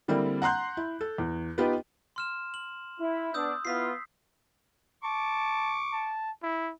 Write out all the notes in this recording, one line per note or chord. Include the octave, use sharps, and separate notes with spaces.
D3 G3 A#3 C4 D4 E4
F#5 A#5 C6 F#6 G6
E4
A4
E2
B3 D#4 F4 G4 B4
C6 F6 E7
F#7
E4
B3 D4 D#6 E6 G6
B3 E4 F4 B6 C7
A5 C#6 D6
A5
E4